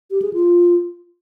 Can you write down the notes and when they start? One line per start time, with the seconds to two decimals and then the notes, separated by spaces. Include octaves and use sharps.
0.11 G4
0.22 G#4
0.33 F4